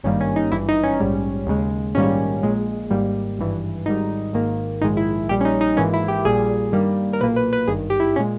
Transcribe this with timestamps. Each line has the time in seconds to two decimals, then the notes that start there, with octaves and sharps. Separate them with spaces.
0.04 G#1 G2 D#3 G3 A#3 C#4
0.20 C#4
0.36 D#4
0.52 G#1 G2 E3 E4
0.68 D#4
0.83 C#4
1.00 A#1 G#2 G3
1.47 D#2 C#3 G#3
1.95 A#1 G#2 D#3 G3 A#3 C#4
2.43 A#1 A#2 G#3
2.90 G#1 G#2 G3 A#3
3.38 G#1 G2 E3
3.86 G#1 G#2 D#3 G3 D#4
4.33 G#1 G#2 D#3 A#3
4.81 A#1 G#2 D#3 G#3 D#4
4.97 E4
5.29 A#1 A#2 G3 G4
5.41 C#4
5.45 D#4
5.61 D#4
5.77 G#1 G#2 E3 A#3 C#4
5.93 E4
6.08 G4
6.25 A#1 A#2 G3 G#4
6.72 G2 D#3 G3 A#3
7.13 A#4
7.20 B1 A#2 A#3 B4
7.36 B4
7.53 B4
7.67 G#1 G2 D#3 G#4
7.90 G4
8.00 E4
8.16 A#2 G#3 C#4